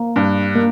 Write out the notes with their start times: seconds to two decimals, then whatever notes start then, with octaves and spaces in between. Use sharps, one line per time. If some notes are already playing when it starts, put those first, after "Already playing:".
Already playing: A#3
0.16 G2
0.55 A#3